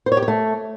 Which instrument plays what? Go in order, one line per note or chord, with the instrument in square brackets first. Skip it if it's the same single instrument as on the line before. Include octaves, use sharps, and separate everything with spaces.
[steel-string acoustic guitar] C5
C#5
G4
C#5
A3